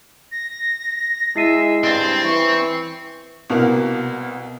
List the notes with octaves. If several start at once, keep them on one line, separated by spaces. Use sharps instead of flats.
A#6
G#3 E4 E5 C7 D#7
G2 C4 A6
E3 C#6
C2 B2 A#3